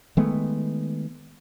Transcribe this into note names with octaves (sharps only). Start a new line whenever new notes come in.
D#3 G#3 A3 B3